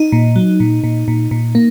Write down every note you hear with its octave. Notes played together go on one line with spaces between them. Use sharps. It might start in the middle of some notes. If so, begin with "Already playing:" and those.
Already playing: D#4
A#2
F#3
A#2
A#2
A#2
A#2
A#3